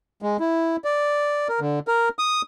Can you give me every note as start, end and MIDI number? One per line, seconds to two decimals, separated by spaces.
0.22 0.37 56
0.40 0.76 64
0.84 1.48 74
1.49 1.60 70
1.60 1.79 50
1.88 2.09 70
2.19 2.42 87